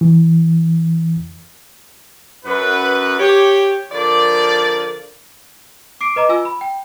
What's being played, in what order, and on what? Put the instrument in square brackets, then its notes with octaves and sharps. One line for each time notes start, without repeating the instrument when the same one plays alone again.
[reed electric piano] E3
[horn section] F#2 F#3 B4
G4 C#5
D3 F3 A#4 D5
[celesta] D6 C7 D7
B4 D#5 A#5 D6
F4 G#5 E6
B5
G5